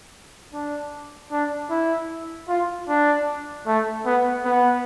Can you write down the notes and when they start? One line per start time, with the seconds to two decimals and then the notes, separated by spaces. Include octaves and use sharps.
0.53 D4
1.32 D4
1.70 E4
2.48 F4
2.88 D4
3.67 A3
4.06 B3
4.45 B3